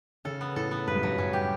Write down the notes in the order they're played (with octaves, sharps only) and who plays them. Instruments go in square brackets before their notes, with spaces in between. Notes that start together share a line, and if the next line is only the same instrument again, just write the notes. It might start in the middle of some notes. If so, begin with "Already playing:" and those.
[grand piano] C#3 [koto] A4
[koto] B3
[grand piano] A2 [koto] A4
[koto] B3
[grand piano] G2 [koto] B4
[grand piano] F#2
[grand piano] G2 [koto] F#3
[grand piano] G2 [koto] C#4
[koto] G4